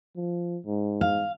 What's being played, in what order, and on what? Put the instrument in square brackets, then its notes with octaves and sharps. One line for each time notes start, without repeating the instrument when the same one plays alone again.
[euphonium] F3
G#2
[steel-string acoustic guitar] F5